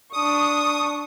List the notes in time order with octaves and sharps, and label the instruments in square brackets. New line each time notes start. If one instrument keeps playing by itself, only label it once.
[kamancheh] D4 C#6 [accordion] D#6